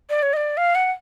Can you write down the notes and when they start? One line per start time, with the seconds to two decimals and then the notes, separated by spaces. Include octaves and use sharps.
0.10 D5
0.23 C#5
0.33 D#5
0.37 D5
0.57 F5
0.75 F#5